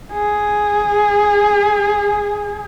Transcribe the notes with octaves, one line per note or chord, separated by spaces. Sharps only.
G#4